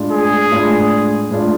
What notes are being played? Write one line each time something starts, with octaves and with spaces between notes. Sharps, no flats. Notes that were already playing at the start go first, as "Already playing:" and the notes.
Already playing: A2 G#3 D4 F4
G#4
A2 G#3 D4 F4
A2 G#3 D4 F4